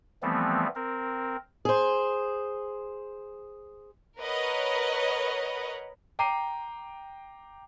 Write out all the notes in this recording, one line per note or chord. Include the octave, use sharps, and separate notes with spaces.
E3 F3 G3 A3 B3 C4
C4 A#4
G#4 C5
A#4 B4 C#5 D#5 F#5 B5
G5 A#5 D6 C7 D#7